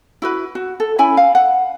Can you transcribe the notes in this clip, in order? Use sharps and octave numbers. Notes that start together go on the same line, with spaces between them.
E4 F#4 B4
F#4
A4
C#4 E4 G#5 B5
F5
F#5